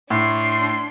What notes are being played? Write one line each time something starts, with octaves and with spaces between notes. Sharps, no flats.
A2 D4 C6